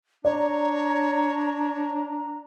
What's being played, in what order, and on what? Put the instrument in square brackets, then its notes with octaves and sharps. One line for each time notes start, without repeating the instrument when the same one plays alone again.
[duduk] D4 [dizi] C#5 [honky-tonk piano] D5 [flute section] A#5